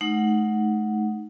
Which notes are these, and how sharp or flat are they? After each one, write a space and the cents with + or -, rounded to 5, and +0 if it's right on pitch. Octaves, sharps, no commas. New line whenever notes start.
A3 -40 D#4 +0 F#5 +0